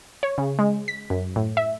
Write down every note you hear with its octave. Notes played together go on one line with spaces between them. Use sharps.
C#5
C#3
G#3
B6
F#2
A2
E5